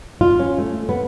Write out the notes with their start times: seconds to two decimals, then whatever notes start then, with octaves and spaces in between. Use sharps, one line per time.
0.21 F4
0.40 C#4
0.58 A3
0.89 B3